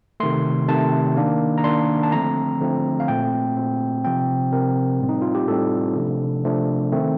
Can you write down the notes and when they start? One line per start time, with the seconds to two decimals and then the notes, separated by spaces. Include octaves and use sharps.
0.20 C3 D#3 A3 C6
0.68 C3 D#3 A3 A5
1.16 D#3 A#3 D4
1.58 A#5
1.64 D#3 A#3 D4 C6
2.03 A5
2.12 D3 F3 A3 C4 A#5
2.61 D3 F3 A3 C4
3.00 F5
3.08 A#2 A3 C4 G5
3.56 A#2 A3 C4
4.04 C3 F3 C4 G5
4.52 C3 F3 C4 A#4
5.01 A2 G3 C4
5.09 D#4
5.22 F4
5.35 G4
5.48 A2 G3 C4 A4
5.96 C3 F3 A3 D4
6.44 C3 F3 A3 D4
6.92 D#3 A3 C4